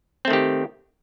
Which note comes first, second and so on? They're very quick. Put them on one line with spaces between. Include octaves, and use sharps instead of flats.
C4 A3 D#3 G4